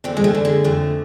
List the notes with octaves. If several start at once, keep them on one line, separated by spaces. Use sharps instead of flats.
D3 C4
G#3
A3
D3
G#3
F2 A3